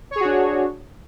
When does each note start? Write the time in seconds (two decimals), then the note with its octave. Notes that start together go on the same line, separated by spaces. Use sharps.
0.11 C#5
0.16 G#4
0.20 F#4
0.25 D4